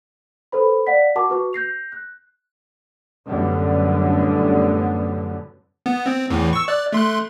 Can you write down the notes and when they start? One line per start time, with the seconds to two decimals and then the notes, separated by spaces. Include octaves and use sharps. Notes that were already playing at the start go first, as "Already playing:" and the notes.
0.52 A4 B4 C5 B5
0.87 D5 F5 F#5 B6
1.15 F#4 A#4 F#5 A5 C#6 D6
1.30 F#4 B4 C#6
1.53 G6 A#6 C7 F7
1.92 F#6
3.28 F#2 A2 D3 G3 B3
5.86 B3
6.06 C4
6.30 E2 A2 E3
6.53 C#6 E6
6.68 D5 F#6
6.92 A3 C6 F#6